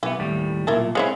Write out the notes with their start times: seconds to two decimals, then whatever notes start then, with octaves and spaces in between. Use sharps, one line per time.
0.03 B1 E3 B3 G4
0.19 D#2 A2 G3
0.67 B1 A#2 E4 A#4 A5
0.95 G#3 C4 E4 C#5 F5 G#5